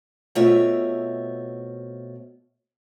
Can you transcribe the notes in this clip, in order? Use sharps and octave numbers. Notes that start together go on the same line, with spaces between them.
B2 A3 C4 F4 C#5 E5